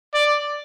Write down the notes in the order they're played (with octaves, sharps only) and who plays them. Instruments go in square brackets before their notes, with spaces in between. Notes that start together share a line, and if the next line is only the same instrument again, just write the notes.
[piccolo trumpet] D5